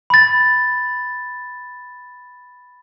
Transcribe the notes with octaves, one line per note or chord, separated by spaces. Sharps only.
B5 A6